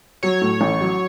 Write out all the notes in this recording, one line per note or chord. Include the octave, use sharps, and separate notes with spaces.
F#3 C#5
A2
A1
F#3